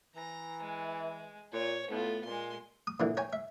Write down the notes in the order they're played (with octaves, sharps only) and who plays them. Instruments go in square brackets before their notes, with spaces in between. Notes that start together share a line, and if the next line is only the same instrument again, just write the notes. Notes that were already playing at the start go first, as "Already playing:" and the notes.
[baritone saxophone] E3 [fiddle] A#5
[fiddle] G#3
[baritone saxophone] A#2 [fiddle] C#5
[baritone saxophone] A2 [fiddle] B3 F4
[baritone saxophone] A#2 [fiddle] G#3 C6
[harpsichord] D#6
A#2 D3 E3
C#5 G5 G#5
E5